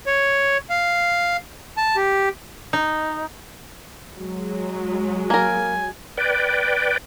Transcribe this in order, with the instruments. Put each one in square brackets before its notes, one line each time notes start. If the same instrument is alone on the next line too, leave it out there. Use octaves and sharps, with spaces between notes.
[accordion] C#5
F5
A5
G4
[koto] D#4
[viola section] F#3 G#3
[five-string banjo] A#3 A#4 [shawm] G#5
[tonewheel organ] B4 D5 G5